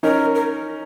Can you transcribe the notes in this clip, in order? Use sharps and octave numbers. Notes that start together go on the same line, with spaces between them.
C#4 D#4 A#4
A#4